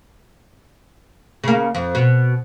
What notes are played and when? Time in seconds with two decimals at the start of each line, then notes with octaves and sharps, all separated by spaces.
1.44 C#3 A#3
1.75 F2
1.95 B2